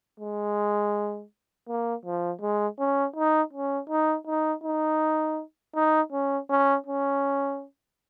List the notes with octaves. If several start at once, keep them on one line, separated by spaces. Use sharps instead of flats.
G#3
A#3
F3
G#3
C#4
D#4
C#4
D#4
D#4
D#4
D#4
C#4
C#4
C#4